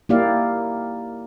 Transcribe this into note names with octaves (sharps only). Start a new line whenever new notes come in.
A#3 D#4 E4 G4 D5 F5